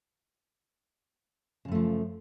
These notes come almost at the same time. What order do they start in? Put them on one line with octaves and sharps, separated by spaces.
C#3 F#2 A3 F3